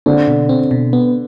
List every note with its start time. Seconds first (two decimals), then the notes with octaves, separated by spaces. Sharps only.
0.06 D3 C4
0.28 B2
0.49 C4
0.71 B2
0.93 B3